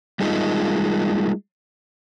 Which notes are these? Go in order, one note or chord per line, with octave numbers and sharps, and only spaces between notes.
G3 G#3 A#3 D#4 F4 D#5